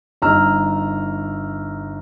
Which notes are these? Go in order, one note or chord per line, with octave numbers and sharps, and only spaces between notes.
G1 D#4 A#5 E6 F6